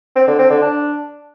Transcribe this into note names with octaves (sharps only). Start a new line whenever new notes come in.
C4
D3
C4
D3
D4